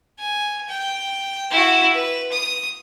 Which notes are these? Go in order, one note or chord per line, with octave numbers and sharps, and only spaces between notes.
G#5
G5
E4 F#4
B4
D#6